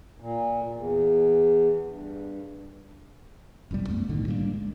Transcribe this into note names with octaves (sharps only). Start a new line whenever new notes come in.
A#2
E2
G2
F#1 C2 B2 G3
F#2 A3 B3
B1 A2 D3 D#3
G3 A#3 C#4 D4
G#3